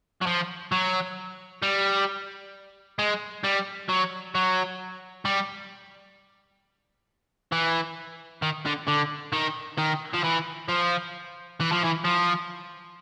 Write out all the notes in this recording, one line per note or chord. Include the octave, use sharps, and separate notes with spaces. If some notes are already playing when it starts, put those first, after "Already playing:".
F#3
F3
F#3
G3
G#3
G3
F#3
F#3
G3
E3
D#3
D3
D3
D#3
D#3
F3
E3
F3
E3
F3
E3
F3